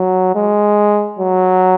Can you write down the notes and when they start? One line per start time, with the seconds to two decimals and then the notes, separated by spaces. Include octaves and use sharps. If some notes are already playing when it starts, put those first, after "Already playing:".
Already playing: F#3
0.35 G#3
1.19 F#3